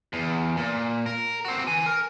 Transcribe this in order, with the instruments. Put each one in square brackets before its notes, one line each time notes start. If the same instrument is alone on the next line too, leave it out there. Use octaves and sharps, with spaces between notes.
[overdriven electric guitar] E2
A#2
A#4
C4 F#4
B4 G#5
A#4